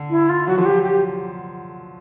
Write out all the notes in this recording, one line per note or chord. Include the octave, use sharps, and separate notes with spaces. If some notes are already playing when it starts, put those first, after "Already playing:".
Already playing: D3
E4
F4
F#3 F#4
F3 F#4
F#3 G4
G4